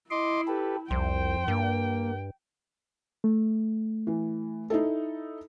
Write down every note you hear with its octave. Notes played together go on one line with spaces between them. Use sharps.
E4 D#5 C6 D6
G4 A4 B4
C2 F2 C5 G5
G2 A#3
A3
E3
D#4 E4 A4